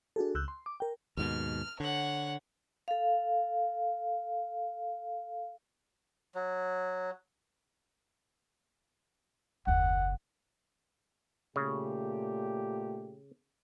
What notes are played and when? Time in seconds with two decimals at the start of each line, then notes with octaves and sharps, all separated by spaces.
0.16 D4 F#4 G#4 A4
0.35 C#2 E6 F#6 G6
0.48 C6
0.66 D6
0.80 A#4 G5
1.17 D#2 G#2 B2 F6
1.80 D3 C#5 F#5
2.88 A4 F5
6.35 F#3
9.67 F#1 D#2 F#5
11.56 A#2 C#3 A3 G4